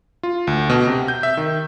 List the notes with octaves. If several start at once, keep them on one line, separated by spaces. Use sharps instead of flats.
F4
D2
B2
C3
G6
E5
D#3